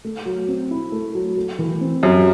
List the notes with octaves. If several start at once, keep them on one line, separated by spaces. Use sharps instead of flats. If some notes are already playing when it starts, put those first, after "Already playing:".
A3
F#3
C4
E4
A3
F#3
A3
E3
C4
F#2 G4